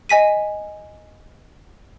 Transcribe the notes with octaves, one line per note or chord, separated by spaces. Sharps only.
D#5 G#5 B6 D#7